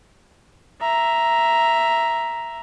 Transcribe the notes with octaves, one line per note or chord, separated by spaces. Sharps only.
E5 A#5